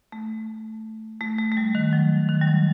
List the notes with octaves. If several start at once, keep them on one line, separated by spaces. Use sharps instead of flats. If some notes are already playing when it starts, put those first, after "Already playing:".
A3
A3
A3
A3
G3
D#3
F#3
D#3
G3
F#3